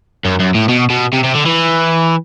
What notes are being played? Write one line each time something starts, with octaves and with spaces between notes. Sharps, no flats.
F#2
F#2
A2
B2
B2
C3
C3
D3
E3